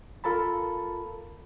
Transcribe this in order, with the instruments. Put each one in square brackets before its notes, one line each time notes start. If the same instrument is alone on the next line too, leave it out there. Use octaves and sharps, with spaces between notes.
[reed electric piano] F4 A4 A#4 A5 B5